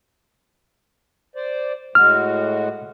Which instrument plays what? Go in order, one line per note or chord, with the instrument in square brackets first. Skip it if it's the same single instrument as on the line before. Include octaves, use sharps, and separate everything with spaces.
[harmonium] C5 D5
[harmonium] A2 G#3 F#4 [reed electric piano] F6